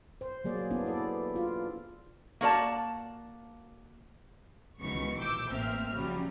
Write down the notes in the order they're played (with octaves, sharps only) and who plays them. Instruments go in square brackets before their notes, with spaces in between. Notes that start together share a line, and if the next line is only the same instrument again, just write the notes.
[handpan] C5
F#3 A#3 G#4 D5
B3 D4 E4
D4 E4 A4 D5
F4
[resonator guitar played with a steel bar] A#3 F#4 A4 D5 A5
[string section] C#2 B2 D#3 E3 C#6 C#7
A#1 D6 E6 G6
A1 A#3 C4 E5 F6
A#1 C#3 F#3 G3